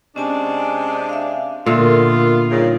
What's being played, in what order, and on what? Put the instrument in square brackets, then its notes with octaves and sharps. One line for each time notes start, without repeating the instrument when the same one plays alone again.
[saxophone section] C3 G#3 D4 [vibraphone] C#4 G#5 A5
[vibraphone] E5 F5
[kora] A#2 D3 [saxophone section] B3 F4 [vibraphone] A#4 E5
[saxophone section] A#2 C#3 [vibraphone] G3 D#4 F4